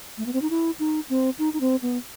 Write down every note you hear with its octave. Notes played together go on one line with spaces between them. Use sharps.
A3
B3
C4
D#4
E4
D#4
C4
D#4
D#4
C4
B3